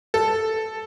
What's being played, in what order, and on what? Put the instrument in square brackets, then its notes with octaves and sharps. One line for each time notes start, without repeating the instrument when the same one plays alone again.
[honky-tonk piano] A4